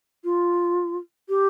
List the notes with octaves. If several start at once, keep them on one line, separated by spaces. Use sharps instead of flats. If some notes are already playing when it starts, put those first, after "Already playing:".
F4
G4